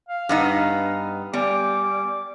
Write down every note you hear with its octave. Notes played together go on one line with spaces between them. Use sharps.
F5
G2 B3 D#4 B4
G3 B3 D5 G#5 D6